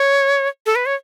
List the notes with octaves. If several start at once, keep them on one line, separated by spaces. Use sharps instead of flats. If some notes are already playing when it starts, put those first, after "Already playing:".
Already playing: C#5
A4
B4
C#5